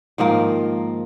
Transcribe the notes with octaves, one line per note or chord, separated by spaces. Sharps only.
G#2 D#3 F3 A#3